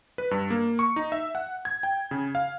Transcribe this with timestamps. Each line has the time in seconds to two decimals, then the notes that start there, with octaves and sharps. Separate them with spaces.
0.18 B4
0.31 G2
0.50 A#3
0.79 C#6
0.96 D#4
1.12 E5
1.35 F#5
1.65 G#6
1.83 G5
2.11 C#3
2.35 F5